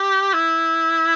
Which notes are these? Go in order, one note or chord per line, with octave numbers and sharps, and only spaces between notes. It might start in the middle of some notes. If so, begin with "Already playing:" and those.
Already playing: G4
E4